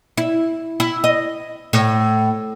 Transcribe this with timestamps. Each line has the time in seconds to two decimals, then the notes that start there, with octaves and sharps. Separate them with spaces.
0.17 E4
0.80 E4
1.04 D#5
1.73 A2